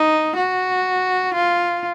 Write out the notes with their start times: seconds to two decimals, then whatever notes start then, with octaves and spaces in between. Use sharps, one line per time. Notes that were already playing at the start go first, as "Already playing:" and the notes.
Already playing: D#4
0.36 F#4
1.35 F4